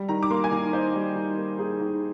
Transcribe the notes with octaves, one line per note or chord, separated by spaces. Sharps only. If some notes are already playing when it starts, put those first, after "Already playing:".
Already playing: G3
D#3 A#5
D6
A#3 C6
G#5
D#3 A#5
D#4 C5
G3
D#3
A#3
D#4 G#4
D#3